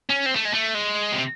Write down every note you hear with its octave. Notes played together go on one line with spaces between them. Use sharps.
C#4
C4
A3
G#3
A3
G#3
C3